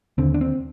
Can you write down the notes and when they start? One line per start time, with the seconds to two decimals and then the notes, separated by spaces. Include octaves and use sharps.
0.18 D#2 D3 C4
0.34 D4
0.41 C4